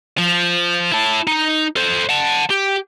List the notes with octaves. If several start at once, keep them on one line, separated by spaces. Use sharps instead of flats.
F3
E4 A5
D#4
A4 C5
F#5 A5
G4